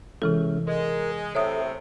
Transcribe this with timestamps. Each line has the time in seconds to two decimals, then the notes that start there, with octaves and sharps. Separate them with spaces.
0.22 C3 E3 G#3 C#4 E4 A4
0.67 G#3 A#4
1.35 A2 C3 A4 C#5 E5 D#6